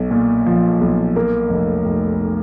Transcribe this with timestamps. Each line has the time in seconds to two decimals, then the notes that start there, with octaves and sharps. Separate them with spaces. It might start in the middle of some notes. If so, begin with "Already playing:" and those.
Already playing: B1
0.11 A#2
0.46 F3
0.81 B1
1.16 A#3
1.50 F1
1.86 F1